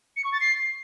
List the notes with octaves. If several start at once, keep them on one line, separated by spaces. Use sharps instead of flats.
C#7
C#6
A6
C7